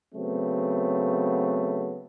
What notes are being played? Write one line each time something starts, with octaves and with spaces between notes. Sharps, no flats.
C#3 F#3 A3 B3 C4